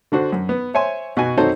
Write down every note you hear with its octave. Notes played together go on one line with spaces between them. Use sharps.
D3 D4 F#4 C5
F#2
B3
C5 C#5 E5 G#5 C6
B2 F#4 G#5
C4 D#4 F#4 A4 C5 C#5